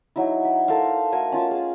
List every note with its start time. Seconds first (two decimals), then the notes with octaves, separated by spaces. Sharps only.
0.16 F#3 D#4 E4
0.45 B5
0.68 A4 A#4 C5 F5
1.12 A3 F#4 A#4 G#5
1.32 C#4 F4 A5
1.51 G#4